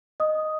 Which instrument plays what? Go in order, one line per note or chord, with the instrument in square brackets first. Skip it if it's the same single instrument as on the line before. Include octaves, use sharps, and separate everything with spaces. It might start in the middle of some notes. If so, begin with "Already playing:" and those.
[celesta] D#5 D#6